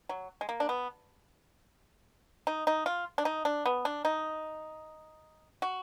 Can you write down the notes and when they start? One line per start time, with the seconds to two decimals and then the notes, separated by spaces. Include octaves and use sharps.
0.09 F#3
0.41 G#3
0.49 A#3
0.60 D4
0.69 B3
2.47 D#4
2.67 D#4
2.86 F4
3.18 D4
3.25 D#4
3.45 D4
3.66 B3
3.85 D4
4.05 D#4
5.62 F#4